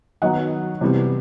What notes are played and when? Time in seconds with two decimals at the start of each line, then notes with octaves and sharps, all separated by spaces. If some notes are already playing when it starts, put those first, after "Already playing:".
0.22 D#3 F#3 B3 D#5 F#5
0.81 C3 E3 G3 B3